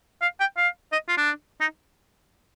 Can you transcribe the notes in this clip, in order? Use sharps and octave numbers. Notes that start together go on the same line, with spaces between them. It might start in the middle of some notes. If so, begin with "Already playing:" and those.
F5
G5
F5
D#5
F4
D4
D#4